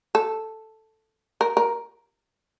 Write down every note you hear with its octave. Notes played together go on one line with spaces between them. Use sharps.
A4
A#4
A#4